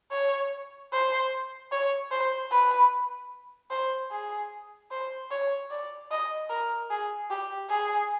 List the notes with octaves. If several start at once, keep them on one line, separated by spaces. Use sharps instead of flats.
C#5
C5
C#5
C5
B4
C5
G#4
C5
C#5
D5
D#5
A#4
G#4
G4
G#4